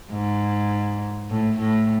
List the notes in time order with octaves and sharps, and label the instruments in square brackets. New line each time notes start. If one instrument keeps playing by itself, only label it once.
[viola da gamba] G#2
A2
A2